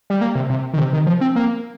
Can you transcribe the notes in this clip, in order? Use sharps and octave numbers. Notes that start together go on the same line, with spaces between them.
G3
A#3
C3
C3
D#3
C3
D#3
F3
C4
A#3